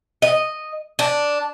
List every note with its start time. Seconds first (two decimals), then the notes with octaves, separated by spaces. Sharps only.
0.22 D#5
0.99 D4